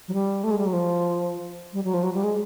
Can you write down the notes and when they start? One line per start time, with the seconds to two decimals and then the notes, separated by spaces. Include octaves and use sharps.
0.08 F#3
0.13 G3
0.44 A3
0.51 G#3
0.58 G3
0.66 F#3
0.73 F3
1.73 G3
1.84 F#3
1.94 F3
2.03 F#3
2.14 G3
2.24 G#3